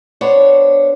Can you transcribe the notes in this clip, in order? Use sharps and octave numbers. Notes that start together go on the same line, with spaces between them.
B3 D4 C5 C#5